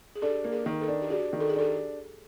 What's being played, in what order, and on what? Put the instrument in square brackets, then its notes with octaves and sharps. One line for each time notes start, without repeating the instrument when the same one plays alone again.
[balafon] G#4
[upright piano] D4 [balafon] G4 A4
[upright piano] A#3
[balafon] G#4 A#4
[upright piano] D#3
[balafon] A4 B4
[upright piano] D4
[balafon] G4
[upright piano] D4 [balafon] F#4 G#4
[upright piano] D#3
[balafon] A4
G#4
[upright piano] D4 [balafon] G4 A4